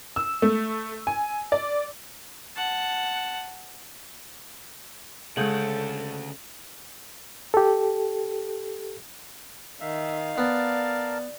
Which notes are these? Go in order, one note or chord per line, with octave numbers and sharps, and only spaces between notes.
E6
A3
G#5
D5
F#5 A5
D2 C#3 G#3 A4 F#5 G6 F#7
G4 A4
D#3 E5 F5
B3 A#4 D5 A5